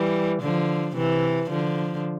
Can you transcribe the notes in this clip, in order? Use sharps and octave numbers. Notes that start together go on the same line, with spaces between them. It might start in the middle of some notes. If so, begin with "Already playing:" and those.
Already playing: E3 G3
D3 F3
C3 E3
D3 F3